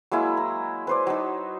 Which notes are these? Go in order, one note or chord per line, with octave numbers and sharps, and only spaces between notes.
F#3 G#3 A#3 E4
A#5
B4 C5 D5
F#3 D#4